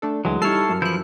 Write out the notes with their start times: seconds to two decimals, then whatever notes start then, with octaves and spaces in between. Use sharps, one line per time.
0.02 A3 D4 A4
0.25 D2 E3 F#3 G#3
0.42 G3 D#4 E4 A4 C#5 F6 C7
0.69 F#2
0.82 E3 F3 E4 F#6 G6